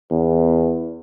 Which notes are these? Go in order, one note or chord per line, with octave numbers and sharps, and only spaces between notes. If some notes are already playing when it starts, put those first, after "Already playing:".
E2